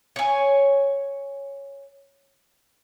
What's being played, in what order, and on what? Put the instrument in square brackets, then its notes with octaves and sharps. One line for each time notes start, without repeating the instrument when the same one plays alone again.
[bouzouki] C#5 G#5